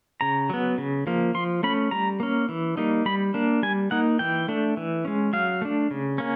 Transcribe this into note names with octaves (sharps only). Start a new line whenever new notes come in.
C#3 A#5
F#3 B3
C#3
F3 A#3
F3 C6
A3 C#4 B5
G3 A#5
A#3 C#4
E3
G3 A#3 D#4
G3 B5
A#3 D4
G3 G#5
A#3 D#4 F#5
E3 G5
A3 D4
E3
G#3 C#4
F#3 F5
A3 D4
C#3
A#3 C#4